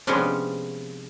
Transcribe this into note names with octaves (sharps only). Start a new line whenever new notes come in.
C3 F3 G#3 B3 C#4 D4